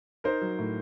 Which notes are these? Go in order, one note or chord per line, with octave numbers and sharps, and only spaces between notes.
D#4 A#4 C5
F#3
A2